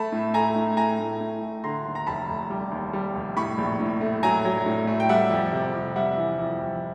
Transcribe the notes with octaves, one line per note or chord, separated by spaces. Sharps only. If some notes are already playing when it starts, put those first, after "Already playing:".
Already playing: A3 A5 B5
A2
A3 G#5 A#5
A2
A2 G#5 A#5
A2
A2
A3
D3 A#5 C6
D#2
A#5
F1 A5 B5
F1
G3
D#2
G3
F1
A2 B5 C#6
A#1
A2
A3
F#3 G#5 A#5
F#3
A2
A3
G5
G3 E5 F#5
F2
C3
F2
G3 E5 F#5
E3
F2
F2